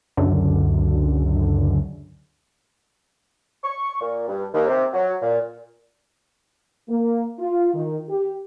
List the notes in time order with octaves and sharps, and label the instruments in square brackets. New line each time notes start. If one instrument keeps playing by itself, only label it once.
[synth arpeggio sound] C#2 F#2 D3
[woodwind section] C#6
A#2
G2
D#2
C3
F#3
A#2
[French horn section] A#3
F4
D#3
G4